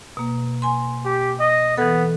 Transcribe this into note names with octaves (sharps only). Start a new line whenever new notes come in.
B2 A#3
G#5 C6
G4
D#5
E3 B3 A4